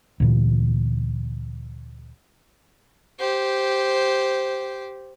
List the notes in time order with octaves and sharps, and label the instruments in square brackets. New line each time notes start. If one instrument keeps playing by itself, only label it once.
[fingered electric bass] D2 A#2 E3
[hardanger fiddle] G4 C5